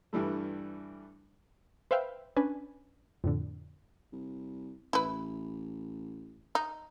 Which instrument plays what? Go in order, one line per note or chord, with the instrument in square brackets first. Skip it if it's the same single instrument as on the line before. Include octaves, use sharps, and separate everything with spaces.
[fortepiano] G2 E3 G3 A3
[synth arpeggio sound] B4 C5 E5 F5 G5
C#4 D4 B4 G#5
F2 A2 D3
[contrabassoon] C2
[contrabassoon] A1 [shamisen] E4 B4
[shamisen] D#4